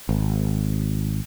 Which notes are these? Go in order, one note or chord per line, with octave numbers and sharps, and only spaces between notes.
G#1